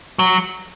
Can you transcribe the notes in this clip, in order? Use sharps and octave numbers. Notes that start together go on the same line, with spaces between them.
F#3